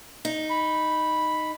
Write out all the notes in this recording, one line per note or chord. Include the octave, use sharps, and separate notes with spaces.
D#4
B5